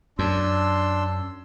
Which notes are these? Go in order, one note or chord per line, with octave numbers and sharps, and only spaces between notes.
F#2 D4 C6 E6